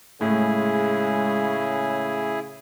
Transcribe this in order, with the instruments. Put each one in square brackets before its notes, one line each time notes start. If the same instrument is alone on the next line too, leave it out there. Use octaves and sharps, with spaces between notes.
[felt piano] A2 [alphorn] C#3 [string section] G#3 [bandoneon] E4 G#4